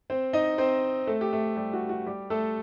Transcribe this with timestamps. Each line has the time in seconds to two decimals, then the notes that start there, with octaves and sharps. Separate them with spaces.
0.10 C4 C5
0.33 D#4 D#5
0.58 C4 C5
1.07 A3 A4
1.21 G4
1.33 A3 A4
1.57 G3 G4
1.73 F#4
1.89 F#4
2.06 G3 G4
2.30 A3 A4